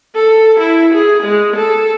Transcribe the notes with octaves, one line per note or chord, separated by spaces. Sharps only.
A4
E4
G#4
G#3
A4